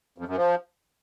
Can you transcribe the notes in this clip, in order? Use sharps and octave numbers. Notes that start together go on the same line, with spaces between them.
F2
F#2
F3